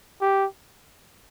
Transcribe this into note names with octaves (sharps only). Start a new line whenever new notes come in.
G4